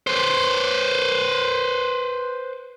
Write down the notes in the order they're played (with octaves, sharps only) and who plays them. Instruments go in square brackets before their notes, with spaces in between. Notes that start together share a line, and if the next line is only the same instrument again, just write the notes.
[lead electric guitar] B4 C5